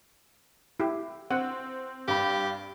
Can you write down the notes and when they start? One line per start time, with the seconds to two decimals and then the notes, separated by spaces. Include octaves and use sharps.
0.80 E4 G4
1.31 C4 F#5
2.08 G2 G4 B5